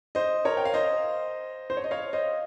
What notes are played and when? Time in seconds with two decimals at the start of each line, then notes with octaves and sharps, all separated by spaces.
0.15 C5 D#5
0.45 A#4 C#5
0.57 G5
0.65 F5
0.74 C5 D#5
1.70 C5
1.77 C#5
1.84 D#5
1.91 C#5 F5
2.13 C5 D#5